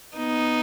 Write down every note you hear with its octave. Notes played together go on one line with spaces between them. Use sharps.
B3 D#4